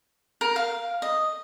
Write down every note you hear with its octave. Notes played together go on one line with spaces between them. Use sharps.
A#4
F5
D#5